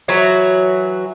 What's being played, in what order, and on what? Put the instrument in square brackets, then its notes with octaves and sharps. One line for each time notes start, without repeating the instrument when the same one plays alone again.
[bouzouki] E3 F#3 F#4